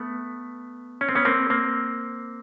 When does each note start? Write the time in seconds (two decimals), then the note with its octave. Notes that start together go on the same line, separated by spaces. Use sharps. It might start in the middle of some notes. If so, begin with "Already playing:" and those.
Already playing: A3 B3
1.01 C#4
1.09 C4
1.15 B3 C#4
1.25 A#3 C4
1.50 A#3 C4